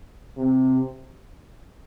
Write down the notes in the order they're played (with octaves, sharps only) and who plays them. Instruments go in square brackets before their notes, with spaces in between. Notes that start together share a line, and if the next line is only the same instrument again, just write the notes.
[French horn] C3